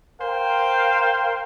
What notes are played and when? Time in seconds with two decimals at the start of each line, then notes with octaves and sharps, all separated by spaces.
0.21 A#4 C5 F5 G5